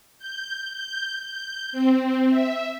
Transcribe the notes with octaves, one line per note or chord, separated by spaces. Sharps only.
G6
G6
G6
C4
E5